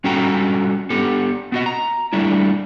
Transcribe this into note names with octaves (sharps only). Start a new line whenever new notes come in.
G3 C#4 F#4 A4 G5 A#5
B3 G4 A4
B3 F#4 D#5
A#5
G3 A3 D4 E4